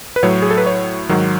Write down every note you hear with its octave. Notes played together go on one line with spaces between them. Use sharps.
B4
A2 F#3 C#5
G#4
A4
B4
C#5
G#2 D#3 F#3